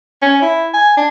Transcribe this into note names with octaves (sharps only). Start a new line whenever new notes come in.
C#4
E4
G#5
D4